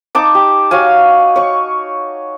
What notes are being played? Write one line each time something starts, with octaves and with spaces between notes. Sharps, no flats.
D#4 A5 D6
G4
F#4 C#5 F5 G#5
C#5 C#6